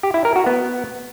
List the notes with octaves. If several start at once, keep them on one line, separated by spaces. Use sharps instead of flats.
G4
E4
A#4
F#4
B3